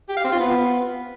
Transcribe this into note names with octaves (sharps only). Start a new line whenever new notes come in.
G4
F5
C4
F4
B3